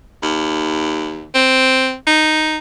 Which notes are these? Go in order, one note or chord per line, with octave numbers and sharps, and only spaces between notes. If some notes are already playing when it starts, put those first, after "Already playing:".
D#2
C4
D#4